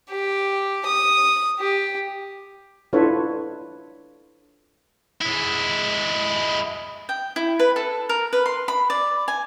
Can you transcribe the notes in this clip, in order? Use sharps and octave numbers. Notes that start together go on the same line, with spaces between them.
G4
D#6
G4
D4 E4 F4 A4 B4 C#5
G#3 E4
G5
E4
B4
A4
A#4
B4
C6
B5
D5
G#5